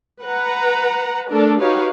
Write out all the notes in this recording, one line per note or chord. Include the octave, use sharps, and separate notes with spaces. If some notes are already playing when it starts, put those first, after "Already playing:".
B4 F#5 A#5
A3 D4 A4 A#4
D#4 F#4 G4 B4 C#5 F5